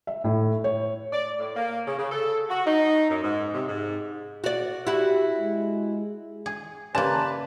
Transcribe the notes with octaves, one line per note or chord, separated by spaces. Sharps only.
E5
A2
C#5
D5
A2
A#3
C#3
C#3
A4
F#4
D#4
F#2
G#2
C3
G#2
F#4 D5
E4 F#4 G4
G#3
G#4
C#3 A#3 G4 B4 D5 A5 C6